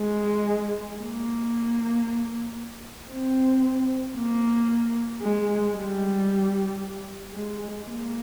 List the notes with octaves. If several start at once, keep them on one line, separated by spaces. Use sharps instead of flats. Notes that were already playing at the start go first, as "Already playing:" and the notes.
Already playing: G#3
A#3
C4
A#3
G#3
G3
G#3
A#3